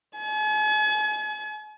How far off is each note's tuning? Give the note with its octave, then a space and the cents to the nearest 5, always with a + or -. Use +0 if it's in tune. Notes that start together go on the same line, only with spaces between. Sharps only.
G#5 +45